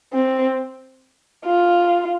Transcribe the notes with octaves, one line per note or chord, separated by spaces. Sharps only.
C4
F4